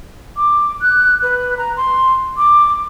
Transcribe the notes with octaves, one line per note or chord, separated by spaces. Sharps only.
D6
F#6
B4
A#5
C6
D6